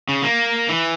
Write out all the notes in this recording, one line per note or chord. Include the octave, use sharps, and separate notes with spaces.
C#3
A#3
E3